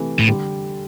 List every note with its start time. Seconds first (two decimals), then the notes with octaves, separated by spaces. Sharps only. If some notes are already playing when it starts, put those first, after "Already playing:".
Already playing: C3 E3 A3
0.19 A2
0.27 D3 G3